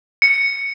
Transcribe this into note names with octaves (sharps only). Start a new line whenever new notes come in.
C#7